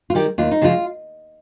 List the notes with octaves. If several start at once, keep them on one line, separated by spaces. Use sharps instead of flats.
F4
D#3 G3 G4
D#2 F4
D#4
C#3 F3 G#3 F4